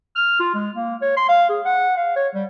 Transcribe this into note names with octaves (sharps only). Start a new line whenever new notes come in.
F6
F4
G#3
A#3
C#5
C6
F5
G#4
F#5
F5
C#5
G3